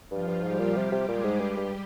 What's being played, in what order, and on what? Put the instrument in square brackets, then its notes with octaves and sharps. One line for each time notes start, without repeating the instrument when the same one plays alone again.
[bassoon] G2 [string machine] F3 F4
[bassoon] G2
[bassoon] G#2 [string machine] G3 G4
[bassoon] A#2
[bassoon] C3 [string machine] G3 G4
[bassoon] C3
[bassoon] A#2 [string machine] G#3 G#4
[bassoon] G#2
[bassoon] G2 [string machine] G3 G4
[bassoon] G2